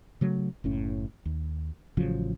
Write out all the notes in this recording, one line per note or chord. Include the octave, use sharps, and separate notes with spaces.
C#3 F#3 A3
F#1 A2 C#4
D#2
A1 C#3 F3 F#3